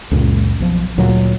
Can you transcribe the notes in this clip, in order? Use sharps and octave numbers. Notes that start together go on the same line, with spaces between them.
C#2 F#2 A#2
B1 F3
D2 A#2 F#3